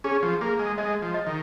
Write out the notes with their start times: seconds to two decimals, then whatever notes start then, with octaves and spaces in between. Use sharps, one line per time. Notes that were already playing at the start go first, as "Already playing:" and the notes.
0.04 C#4 G#4
0.23 F3
0.41 A#3 G#4
0.59 G#3
0.78 G#3 D#5
1.02 F3
1.14 D#5
1.26 D#3